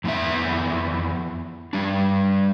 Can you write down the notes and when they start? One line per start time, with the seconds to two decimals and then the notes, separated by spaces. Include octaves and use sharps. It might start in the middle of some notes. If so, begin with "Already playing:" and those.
0.04 F2 C3 E3 B3 E5
1.73 G3 D4